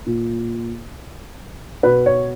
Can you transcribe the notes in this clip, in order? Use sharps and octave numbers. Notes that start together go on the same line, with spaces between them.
A#2
B2 B4
C#5